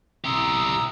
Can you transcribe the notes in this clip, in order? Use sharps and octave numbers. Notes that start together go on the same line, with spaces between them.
E4 G4 A#5 D#6 E6